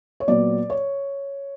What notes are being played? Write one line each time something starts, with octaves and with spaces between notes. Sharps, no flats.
C#5
A#2 F#3 B3 D5
C#5